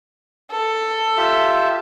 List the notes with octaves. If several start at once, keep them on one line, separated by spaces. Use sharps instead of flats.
A4
F4 G4 E5